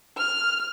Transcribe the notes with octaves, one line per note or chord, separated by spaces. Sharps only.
F6